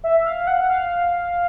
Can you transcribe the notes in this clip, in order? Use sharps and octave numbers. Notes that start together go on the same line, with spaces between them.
E5
F5
F#5
F5